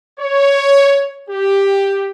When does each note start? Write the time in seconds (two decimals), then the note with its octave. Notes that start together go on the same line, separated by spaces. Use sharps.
0.20 C#5
1.29 G4